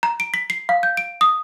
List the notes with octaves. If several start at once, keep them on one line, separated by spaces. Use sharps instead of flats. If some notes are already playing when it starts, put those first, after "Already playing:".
A#5
D7
B6
C7
F5
G6
D7
D#6